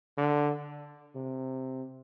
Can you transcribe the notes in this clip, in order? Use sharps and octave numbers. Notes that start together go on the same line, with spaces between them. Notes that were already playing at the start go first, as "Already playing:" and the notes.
D3
C3